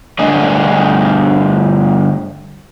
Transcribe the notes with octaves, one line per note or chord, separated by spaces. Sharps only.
G2 D3 A3 D4 G#4 D#5